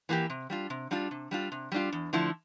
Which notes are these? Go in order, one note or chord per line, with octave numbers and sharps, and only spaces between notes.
E3 A#3 E4 G4
C3
G3 D4 F4
C3
G3 D4 F4
C3
G3 D4 F4
C3
G3 D4 F4
E2
D3 F3 A3 E4